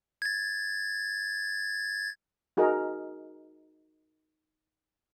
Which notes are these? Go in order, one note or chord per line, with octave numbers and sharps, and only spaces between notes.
G#6 A6
D#4 F#4 G#4 A#4 D#5